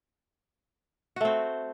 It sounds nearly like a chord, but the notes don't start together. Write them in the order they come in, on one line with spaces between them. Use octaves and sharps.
F#4 A3 C4